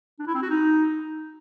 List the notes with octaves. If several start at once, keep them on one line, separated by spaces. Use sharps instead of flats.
D4
E4
C4
F#4
D#4